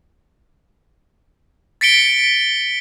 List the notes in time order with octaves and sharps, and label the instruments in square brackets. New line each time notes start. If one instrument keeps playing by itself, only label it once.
[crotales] A6 B6 C#7 D7 G7